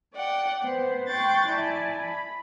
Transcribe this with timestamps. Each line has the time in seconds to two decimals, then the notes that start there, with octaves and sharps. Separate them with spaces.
0.14 D5 F#5 G5
0.63 B3 C5
1.07 G5 C6 C#6 F#6 G6 A6
1.47 E4 D5 G#5 A5
2.02 B5